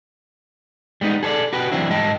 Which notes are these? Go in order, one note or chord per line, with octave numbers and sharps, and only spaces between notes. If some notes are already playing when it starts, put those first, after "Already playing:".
G3 G#3 B3 D#4
G#4 A4 C#5 D5
F#4 G4 B4
E3 F#3 C4 D4 E4
G#2 G3 D#5 G5 A5